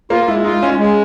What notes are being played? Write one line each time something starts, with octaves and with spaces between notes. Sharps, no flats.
A#3 F4
G#3 E4
D#4 F4
G#3 C#4
G#3